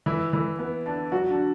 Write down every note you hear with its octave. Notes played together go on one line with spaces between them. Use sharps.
E3 E4
E3 E4
B3
D3 D4
F#3 F#4
D3 D4